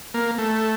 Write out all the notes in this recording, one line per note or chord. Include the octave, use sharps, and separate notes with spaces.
A#3
A3